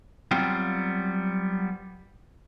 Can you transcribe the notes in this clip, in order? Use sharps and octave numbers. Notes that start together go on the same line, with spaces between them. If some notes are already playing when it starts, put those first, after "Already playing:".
F#3 G3 B3 C4 F4